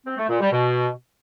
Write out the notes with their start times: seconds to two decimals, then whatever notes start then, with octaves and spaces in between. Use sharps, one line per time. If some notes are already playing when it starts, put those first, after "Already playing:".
0.06 C4
0.18 A3
0.29 A#2
0.40 G3
0.51 B2